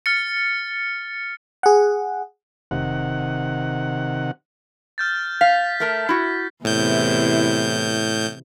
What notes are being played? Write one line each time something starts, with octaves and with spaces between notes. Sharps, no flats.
F6 A6 C#7
G#4 F#5
F1 C3 D#3 F#5
F6 G6 A6
F5 B6
A3 A#4 A5
E4 F#4
E2 A2 C3 E4 G6